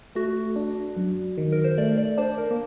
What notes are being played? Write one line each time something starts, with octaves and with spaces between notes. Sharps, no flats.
A3 F#4
D4
F#2
D#3
A#4
C5
A3 D5
D5
D4 C5
A#4
A#3